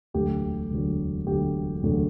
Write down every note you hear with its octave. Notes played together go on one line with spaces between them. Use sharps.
E1 D2 D3 F#3 G4
E1 D2 D3 F#3
E1 D2 D3 F#3 G4
E1 D2 D3 F#3